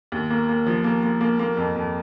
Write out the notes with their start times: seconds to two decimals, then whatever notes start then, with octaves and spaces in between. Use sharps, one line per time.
0.12 D#2
0.30 A#3
0.49 A#3
0.66 F3
0.84 A#3
1.03 A#3
1.21 A#3
1.39 A#3
1.57 F2
1.76 F2